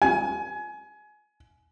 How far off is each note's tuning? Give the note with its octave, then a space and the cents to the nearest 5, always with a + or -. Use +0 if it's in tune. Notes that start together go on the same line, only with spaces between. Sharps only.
G#5 +25